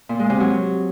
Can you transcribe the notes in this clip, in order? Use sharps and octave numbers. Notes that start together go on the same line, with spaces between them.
A#2
G#3
C3
F#3